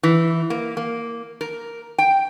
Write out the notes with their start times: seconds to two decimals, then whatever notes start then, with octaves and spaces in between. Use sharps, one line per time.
0.03 E3
0.50 A#3
0.77 A#3
1.41 A#4
1.98 G5